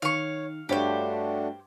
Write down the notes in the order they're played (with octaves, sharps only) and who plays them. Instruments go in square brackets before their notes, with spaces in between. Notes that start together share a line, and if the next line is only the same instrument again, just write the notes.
[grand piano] D#3 [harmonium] C#5 [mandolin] F5 C#6
[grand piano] G2 C#5 [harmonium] A3 D4 F#4 [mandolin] G4 C5